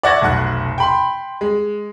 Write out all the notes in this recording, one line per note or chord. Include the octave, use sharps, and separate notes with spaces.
D5 E5 F#5 C#6 G#6 A#6
F1 B1 F#5 F#6
G5 B5 C6
G#3